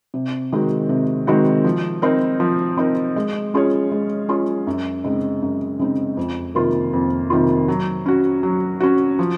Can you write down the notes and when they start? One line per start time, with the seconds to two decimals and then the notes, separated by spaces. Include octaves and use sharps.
0.14 C3
0.52 D#3 G#3 C4 F#4
0.89 C3
1.27 D#3 G#3 C4 F#4
1.64 F3
2.02 C4 D#4 A#4
2.40 F3
2.77 C4 D#4 A#4
3.16 G#3
3.54 C#4 F4 G#4 C#5
3.92 G#3
4.29 C#4 F4 G#4 C#5
4.67 F#2
5.04 C#3 G#3 C4 D#4
5.42 F#2
5.79 C#3 G#3 C4 D#4
6.17 F2
6.55 C3 D#3 A#3 F4
6.93 F2
7.30 C3 D#3 A#3 F4
7.68 F#3
8.06 C#4 F#4
8.43 F#3
8.80 C#4 F#4
9.19 F3